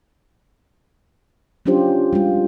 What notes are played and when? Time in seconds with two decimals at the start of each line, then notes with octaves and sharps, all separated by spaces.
1.66 F#3 C#4 D4 F4 G4 C5
2.13 G3 G#3 F4